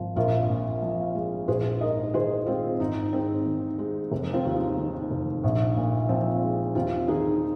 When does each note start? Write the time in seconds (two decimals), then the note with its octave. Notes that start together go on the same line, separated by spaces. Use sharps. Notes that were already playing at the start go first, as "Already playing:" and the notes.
Already playing: G#1 F3
0.16 A#1 F4 A#4
0.49 A#2
0.82 F3
1.15 G#3
1.47 A#1 G#4 C5
1.81 G#2 A#4 D#5
2.14 D#3 G#4 C5
2.46 G#3 C4 F4
2.80 G#1 D#4
3.13 G#2 C4
3.46 D#3
3.78 G#3
4.11 F1
4.33 C4 F4
4.45 D#2
4.55 D#4
4.77 D#3
5.10 F1
5.44 A#1
5.76 A#2
6.09 F3 C4
6.42 G#3
6.75 D#2 C4 F4
7.08 D#3 D#4 G#4